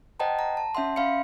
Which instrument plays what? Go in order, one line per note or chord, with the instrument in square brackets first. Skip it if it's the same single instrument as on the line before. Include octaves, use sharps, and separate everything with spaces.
[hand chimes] C5 D#5 F#5 G5 A5 A#5
A#5
A5
C#4 E5 F#5 C6
C#4 E5 F5 B5 C6 C#7